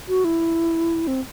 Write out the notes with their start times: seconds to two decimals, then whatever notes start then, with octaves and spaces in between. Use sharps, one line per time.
0.08 F#4
0.25 E4
1.07 C4